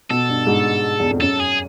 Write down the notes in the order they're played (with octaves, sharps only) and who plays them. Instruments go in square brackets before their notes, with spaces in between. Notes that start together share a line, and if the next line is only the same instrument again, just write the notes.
[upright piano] B2 [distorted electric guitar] A4
[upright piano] G2
G#2
E2
F2
[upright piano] F#2 [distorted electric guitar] A4
[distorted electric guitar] G#4